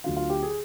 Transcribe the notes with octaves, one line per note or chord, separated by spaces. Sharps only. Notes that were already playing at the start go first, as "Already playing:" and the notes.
D2 D3 F#3 F4
F4
G4
G#4